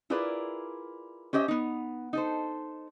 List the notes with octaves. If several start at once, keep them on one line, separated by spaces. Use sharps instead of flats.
E4 F4 G#4 A#4 B4 D5
C#4 G4 C5 D#5 E5
B3 D#4
D#4 A4 C5